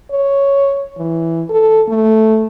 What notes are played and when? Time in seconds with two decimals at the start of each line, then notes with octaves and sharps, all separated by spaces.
0.11 C#5
0.97 E3
1.50 A4
1.88 A3